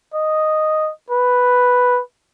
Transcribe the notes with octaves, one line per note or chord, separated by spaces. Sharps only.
D#5
B4